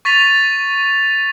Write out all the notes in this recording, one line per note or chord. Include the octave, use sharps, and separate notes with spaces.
C#6 A6 B6 D#7 F7